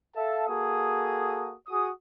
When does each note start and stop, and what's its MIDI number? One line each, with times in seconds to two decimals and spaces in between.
0.15 0.43 69
0.15 0.43 76
0.15 0.43 77
0.15 0.43 81
0.48 1.54 58
0.48 1.54 66
0.48 1.54 68
0.48 1.54 69
0.48 1.54 87
1.68 1.87 66
1.68 1.87 68
1.68 1.87 87